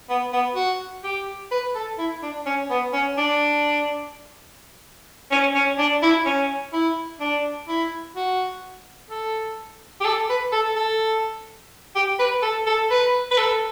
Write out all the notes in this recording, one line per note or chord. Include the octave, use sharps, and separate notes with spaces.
B3
B3
F#4
G4
B4
A4
E4
D4
C#4
B3
C#4
D4
C#4
C#4
D4
E4
C#4
E4
D4
E4
F#4
A4
G4
A4
B4
A4
A4
G4
B4
A4
A4
B4
B4
A4